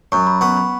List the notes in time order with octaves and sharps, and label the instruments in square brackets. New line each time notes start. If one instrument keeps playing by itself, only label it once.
[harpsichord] F#2 [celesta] C#6
[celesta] B5
[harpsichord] B3 [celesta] C#6
[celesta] B5